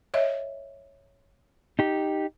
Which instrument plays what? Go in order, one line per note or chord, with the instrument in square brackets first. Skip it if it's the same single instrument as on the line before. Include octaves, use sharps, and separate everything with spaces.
[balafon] C#5 D#5 E5
[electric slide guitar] D#4 G4